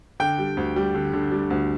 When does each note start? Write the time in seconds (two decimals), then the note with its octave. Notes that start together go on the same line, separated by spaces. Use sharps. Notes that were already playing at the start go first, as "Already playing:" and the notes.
0.20 D3 G5
0.38 G3
0.57 D2
0.76 G3
0.95 D3
1.13 D3
1.32 G3
1.50 D2